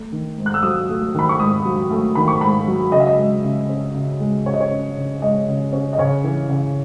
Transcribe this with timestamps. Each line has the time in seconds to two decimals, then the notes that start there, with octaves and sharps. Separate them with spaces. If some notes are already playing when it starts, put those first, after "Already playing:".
Already playing: A3
0.12 D#3
0.38 G#2
0.46 F#6
0.54 E6
0.63 F#3 D#6
0.89 A3
1.14 D#3 B5
1.29 C#6
1.39 G#2 D#6
1.65 F#3
1.90 A3
2.15 D#3 B5
2.28 C#6
2.41 G#2 B5
2.67 F#3
2.92 C#3 D#5
3.00 E5
3.07 D#5
3.18 G#3
3.44 C#3
3.69 C#4
3.94 C#3
4.20 G#3
4.46 C#3 C#5
4.54 D#5
4.61 C#5
4.71 C#4
4.97 C#3
5.22 G#3 D#5
5.48 C#3
5.73 C#4
5.93 D#5
5.98 C#3 C#5
6.24 E3
6.49 C#3